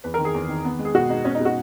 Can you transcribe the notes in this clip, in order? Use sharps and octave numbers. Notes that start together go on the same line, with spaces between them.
E2 B4
A#4
D#3
G#4
E2
D#3
B3
G#3
G#4
B2 F#4
G#3 D#4
B2 C#4
D#4
B2 F#4